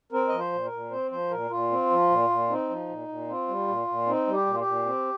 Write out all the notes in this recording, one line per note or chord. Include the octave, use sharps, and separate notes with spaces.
C4 A#4
F3 D#5
C5
A#2
A#4
A#2
C4 C5
F3 C5
A#2 A#4
A#2 F4
C4
F3
A#2
A#2
C4 D#4
F3
A#2
A#2
C4 F4
G3
A#2
A#2
C4 D#4
G3
G4
A#2
F4
G4
A#2
C4